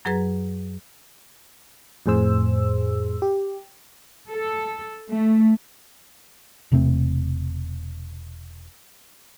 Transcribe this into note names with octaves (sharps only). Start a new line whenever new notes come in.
F#2 F#3 G#4 B4 A#5
F2 A2 G#4 C5 E6
G4
A4
A3
E1 C3 A3 C4